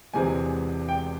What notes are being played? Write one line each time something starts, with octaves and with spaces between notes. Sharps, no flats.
E1 E2 C3 E3 G#3 G#5
G5